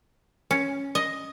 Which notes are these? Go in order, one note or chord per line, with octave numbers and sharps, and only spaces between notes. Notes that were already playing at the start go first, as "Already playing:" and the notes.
C#4
D#5